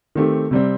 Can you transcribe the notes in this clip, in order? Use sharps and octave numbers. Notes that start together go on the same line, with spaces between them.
D#3 A3 C4 G4
C3 G3 C4